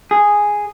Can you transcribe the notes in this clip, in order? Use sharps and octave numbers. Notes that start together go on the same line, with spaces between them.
G#4